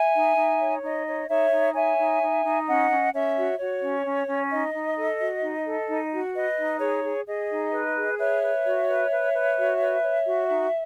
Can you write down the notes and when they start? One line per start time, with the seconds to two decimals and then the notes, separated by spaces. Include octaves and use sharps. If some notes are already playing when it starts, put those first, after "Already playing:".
Already playing: E5 G#5
0.14 D#4
0.37 D#4
0.60 C#5
0.83 D#4 D#5
1.07 C#5
1.29 D#4 C#5 E5
1.52 D#4
1.75 C#5 E5 G#5
1.98 D#4
2.22 D#4
2.44 D#4
2.67 C#4 D#5 F#5
2.90 C#4
3.13 C#4 C#5 E5
3.37 F#4
3.59 F#4 C#5
3.82 C#4
4.05 C#4
4.28 C#4
4.51 D#4 D#5
4.74 D#4
4.96 A4
5.20 F#4
5.42 D#4
5.66 A4
5.89 D#4
6.12 F#4
6.35 B4 D#5
6.58 D#4
6.80 G#4 C#5
7.04 G#4
7.26 G#4 D#5
7.50 D#4
7.73 B4
7.96 G#4
8.18 B4 C#5 E5
8.42 B4
8.65 F#4
8.88 B4
9.11 B4
9.34 B4
9.57 F#4
9.80 B4
10.03 C#5
10.25 F#4
10.49 D#4